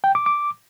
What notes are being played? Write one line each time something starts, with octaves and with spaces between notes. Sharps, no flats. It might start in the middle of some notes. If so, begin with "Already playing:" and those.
G5
D6
D6